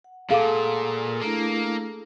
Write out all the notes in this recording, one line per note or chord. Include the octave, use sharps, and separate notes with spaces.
F#5
A#2 G#4 A4 F5 D6
A3 A#3 D4 E4